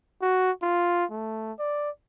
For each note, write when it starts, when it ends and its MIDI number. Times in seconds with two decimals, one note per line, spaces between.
0.22 0.51 66
0.62 1.05 65
1.11 1.52 57
1.59 1.90 74